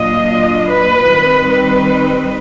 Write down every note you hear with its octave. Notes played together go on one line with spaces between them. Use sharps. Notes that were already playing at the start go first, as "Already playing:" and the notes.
Already playing: A#2 F#3 A#3 D4 F4 D#5
B4
D#3 G3 C4 D#4
B4